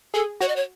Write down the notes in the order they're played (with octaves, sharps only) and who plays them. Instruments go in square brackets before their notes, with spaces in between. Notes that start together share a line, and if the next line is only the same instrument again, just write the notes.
[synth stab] G#4 [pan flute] A4
[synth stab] F#4 [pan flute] C#5
[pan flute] D#5
C#5